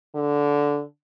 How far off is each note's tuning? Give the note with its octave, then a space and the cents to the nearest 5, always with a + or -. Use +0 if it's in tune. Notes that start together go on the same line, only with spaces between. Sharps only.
D3 -10